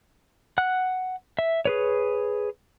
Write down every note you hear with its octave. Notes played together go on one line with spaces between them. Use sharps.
F#5 F#6
E5
G#4 B4 C#5